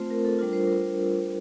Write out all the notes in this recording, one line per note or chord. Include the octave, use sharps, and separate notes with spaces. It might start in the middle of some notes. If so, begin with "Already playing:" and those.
Already playing: A3 C4 F4 C5
A#4
A4
G3 D4 F4 A#4
C5
A#4